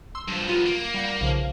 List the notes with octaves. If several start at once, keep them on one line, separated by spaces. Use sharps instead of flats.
C6 E6
G2 F3
F#3 B3 F4
A#3
G3 F#5 C#7
B1 C#3 F3